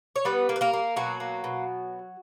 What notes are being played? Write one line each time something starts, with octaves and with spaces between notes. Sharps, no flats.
C#5
G3 B3 B4
A#3
B4
A#3 A#4
A#3
B2 F#3 F#4
A#3
B2